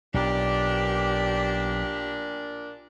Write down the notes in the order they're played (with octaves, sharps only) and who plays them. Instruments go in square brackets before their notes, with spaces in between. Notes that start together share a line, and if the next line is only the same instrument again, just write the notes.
[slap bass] B1 [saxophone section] A#2 A#3 D4 [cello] G4